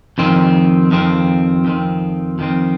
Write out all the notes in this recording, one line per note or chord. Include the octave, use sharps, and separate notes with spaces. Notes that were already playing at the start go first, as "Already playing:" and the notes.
F2 D#3 C4
F2 D#3 C4
F2 D#3 C4
F2 D#3 C4